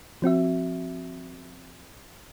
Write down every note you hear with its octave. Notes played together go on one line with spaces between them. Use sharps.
F3 C4 F#4 E5